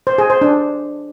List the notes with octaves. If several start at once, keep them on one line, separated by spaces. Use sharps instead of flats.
C5
G#4
C5
D4